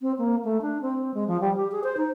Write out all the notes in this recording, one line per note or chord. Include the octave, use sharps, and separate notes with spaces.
C4
A#3
A3
D4
C4
G#3
F3
G3
G4
G#4
C5
D#4